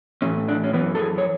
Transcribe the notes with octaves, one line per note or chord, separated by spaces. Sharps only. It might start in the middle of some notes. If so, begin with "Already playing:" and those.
A2 E3 C#4
D4
C#4
F#2 E3 B3
A4
G#4
C#5